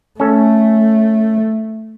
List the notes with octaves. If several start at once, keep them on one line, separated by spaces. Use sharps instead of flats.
A3 C#4 A4